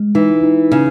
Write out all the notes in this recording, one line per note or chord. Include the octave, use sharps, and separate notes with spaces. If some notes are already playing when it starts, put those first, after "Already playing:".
Already playing: G#3
E3 D#4
D#4
C#3